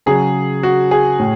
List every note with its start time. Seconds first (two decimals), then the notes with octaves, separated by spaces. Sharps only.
0.06 C#3 F#3 G#4
0.63 F#4
0.91 G#4
1.19 A2